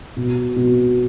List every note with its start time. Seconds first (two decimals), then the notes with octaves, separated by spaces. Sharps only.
0.16 B2
0.56 B2